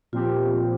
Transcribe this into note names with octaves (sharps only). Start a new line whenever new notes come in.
A#2 F3 C4 F4 G4